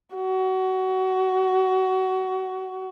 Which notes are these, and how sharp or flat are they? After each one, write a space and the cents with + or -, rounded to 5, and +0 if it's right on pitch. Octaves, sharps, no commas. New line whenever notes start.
F#4 +25